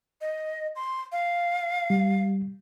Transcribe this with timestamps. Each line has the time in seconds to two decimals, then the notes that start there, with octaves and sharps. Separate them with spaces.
0.21 D#5
0.76 C6
1.12 F5
1.90 G3